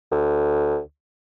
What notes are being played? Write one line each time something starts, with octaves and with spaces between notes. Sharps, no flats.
D2